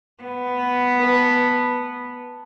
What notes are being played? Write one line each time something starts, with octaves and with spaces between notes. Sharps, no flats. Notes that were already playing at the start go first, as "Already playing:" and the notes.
B3
B4 A5